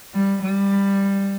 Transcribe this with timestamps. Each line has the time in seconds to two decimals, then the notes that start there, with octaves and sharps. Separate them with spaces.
0.14 G3
0.43 G3